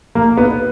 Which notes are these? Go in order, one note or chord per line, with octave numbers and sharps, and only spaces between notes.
A#3
B3